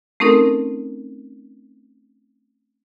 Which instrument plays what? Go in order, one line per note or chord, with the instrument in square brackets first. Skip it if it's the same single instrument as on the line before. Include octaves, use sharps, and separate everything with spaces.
[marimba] A3 C4 C#4 D#4 A4 A#4